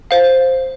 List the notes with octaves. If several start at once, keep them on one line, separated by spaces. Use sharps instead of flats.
C5 F5